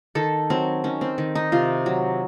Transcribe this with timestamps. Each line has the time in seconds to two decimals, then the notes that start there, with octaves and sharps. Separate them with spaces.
0.15 D#3 A4
0.50 F#3 C4
0.84 D#3 C#4
1.01 C4
1.18 D#3
1.35 D#4
1.52 C3 F4
1.86 F#3